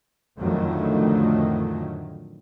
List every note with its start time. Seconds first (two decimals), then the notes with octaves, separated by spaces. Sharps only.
0.37 F2 A2 D3 D#3 F#3 A3